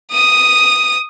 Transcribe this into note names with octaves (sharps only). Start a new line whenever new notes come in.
D#6 D#7